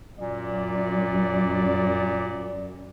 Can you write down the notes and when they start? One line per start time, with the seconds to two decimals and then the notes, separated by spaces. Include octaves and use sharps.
0.19 F#2 A#2 D5